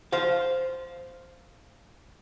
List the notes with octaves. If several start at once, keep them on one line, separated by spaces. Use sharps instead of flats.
C5 F5